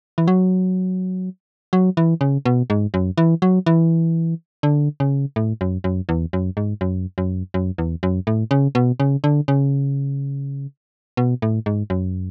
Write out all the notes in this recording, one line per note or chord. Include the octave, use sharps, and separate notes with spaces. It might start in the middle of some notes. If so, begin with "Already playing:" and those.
E3
F#3
F#3
E3
C#3
B2
G#2
F#2
E3
F#3
E3
D3
C#3
A2
F#2
F#2
E2
F#2
G#2
F#2
F#2
F#2
E2
F#2
A2
C#3
B2
C#3
D3
C#3
B2
A2
G#2
F#2